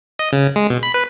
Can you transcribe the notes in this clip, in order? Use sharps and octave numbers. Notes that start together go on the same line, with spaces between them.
D#5
C#3
G#3
B2
B5
B4